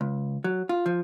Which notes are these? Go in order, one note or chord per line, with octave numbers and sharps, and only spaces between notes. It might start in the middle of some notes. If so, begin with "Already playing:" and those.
C#2
F#3
F4
F3